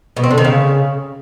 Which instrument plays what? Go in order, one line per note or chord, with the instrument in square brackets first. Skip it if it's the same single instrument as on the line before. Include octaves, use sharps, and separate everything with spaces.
[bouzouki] B2
C4
D3
D#3
C#3